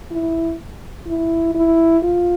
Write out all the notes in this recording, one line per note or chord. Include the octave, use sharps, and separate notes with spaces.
E4
E4
E4
F4